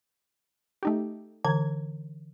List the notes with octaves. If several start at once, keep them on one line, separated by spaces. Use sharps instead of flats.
A3 D#4 G4
D3 E3 A#5 G#6